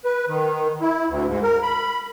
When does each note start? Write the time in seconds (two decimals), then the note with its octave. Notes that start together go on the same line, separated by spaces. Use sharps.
0.05 B4
0.28 D#3
0.81 E4
1.09 D2
1.28 G#2
1.43 A#4
1.63 B5